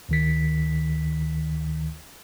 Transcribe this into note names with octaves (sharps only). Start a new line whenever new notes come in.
D2 D#3 B6